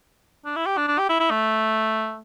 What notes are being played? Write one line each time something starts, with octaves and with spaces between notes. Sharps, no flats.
D4
E4
G4
D4
D4
G4
E4
E4
A3